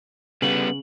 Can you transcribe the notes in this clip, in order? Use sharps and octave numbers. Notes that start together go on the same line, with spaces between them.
C#3 G3 B3 F#7